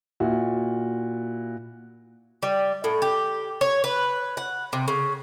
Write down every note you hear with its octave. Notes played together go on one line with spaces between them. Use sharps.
A#2 E4 F#4
G3
A2
G4
C#5
B4
F#5
C3
C#3